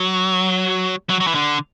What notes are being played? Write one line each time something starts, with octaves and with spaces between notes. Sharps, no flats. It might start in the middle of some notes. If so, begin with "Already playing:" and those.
Already playing: F#3
F#3
F#3
E3
D3